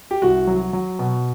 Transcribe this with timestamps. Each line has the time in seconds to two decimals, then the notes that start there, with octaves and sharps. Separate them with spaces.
0.11 G4
0.22 C2 F#4
0.47 F#3
0.73 F#3
0.99 B2